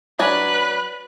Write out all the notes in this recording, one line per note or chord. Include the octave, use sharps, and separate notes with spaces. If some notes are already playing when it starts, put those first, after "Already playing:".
F#3 D4 B4 G#5 F#6